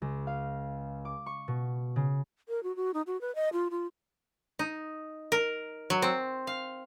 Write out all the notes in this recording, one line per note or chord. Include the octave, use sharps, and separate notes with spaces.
C#2
F5
D6
C#6
B2
C#3
A#4
F#4
F#4
D#4
F#4
B4
D#5
F4
F4
D#4
A#4
F#3
C4
F5